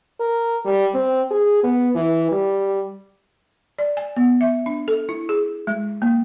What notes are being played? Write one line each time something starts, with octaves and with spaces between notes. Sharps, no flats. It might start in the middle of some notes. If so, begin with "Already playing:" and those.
A#4
G3
C4
G#4
B3
E3
G3
D5
G#5
B3
E5
D4
A4
E4
G#4
G#3
A#3